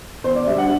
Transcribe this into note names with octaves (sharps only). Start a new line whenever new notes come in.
E2 C5
D5
D3 G3 D4 E5
F#5